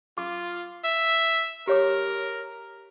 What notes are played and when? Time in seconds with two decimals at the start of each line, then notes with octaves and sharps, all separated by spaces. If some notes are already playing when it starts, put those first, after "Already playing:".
0.18 F4 D6
0.84 E5
1.67 G4 A#4 C#5 D6